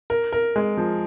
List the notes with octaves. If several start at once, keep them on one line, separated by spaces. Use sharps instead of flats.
A#4
A#4
G#3
F3